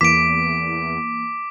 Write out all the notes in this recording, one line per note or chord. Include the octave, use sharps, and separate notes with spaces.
E2 E3 A#3 D6 B6 D7